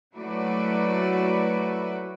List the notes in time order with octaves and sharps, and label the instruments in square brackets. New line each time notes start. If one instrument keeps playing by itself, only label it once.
[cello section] F#3 A3 E4 F#4 B4 D5